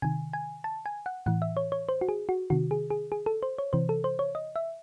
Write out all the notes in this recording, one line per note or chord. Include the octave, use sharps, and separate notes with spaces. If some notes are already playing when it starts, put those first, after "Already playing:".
C3 D#3 G#5
G#5
A5
G#5
F#5
A2 E3 F#5
E5
C#5
C#5
C5
F#4
G#4
F#4
C3 D#3 F#4
G#4
G#4
G#4
A4
C5
C#5
C3 E3 C5
A4
C5
C#5
D#5
E5